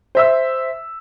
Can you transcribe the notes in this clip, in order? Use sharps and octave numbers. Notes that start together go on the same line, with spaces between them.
C5 E5 E6